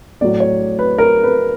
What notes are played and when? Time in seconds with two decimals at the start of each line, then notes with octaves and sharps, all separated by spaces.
0.21 A2 F#3 D5
0.40 C#5
0.79 B4
0.98 A#4
1.24 B4